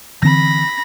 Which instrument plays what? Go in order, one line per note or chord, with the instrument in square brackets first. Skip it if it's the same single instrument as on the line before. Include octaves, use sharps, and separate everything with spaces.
[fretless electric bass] D3 E3 C4 [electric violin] B5 A#6